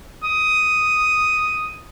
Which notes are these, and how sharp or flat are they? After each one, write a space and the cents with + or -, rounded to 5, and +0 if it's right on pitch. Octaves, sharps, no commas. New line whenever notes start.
D#6 +5